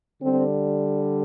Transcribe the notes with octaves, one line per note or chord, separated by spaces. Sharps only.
D3 G3 C4